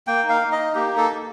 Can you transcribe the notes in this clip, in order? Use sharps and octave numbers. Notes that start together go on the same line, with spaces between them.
A#3 G5
D#4
F5
D#4
D#5
D#4
A#3 G4
D#4
A4
D#4